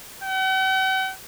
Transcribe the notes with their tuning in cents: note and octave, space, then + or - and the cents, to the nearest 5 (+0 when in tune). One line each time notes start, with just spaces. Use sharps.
F#5 +45